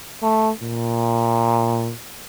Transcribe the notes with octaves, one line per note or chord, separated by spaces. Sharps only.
A3
A#2